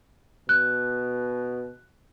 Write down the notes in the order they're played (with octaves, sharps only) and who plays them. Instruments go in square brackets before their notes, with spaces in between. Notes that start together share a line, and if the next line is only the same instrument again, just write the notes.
[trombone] B2 [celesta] F#6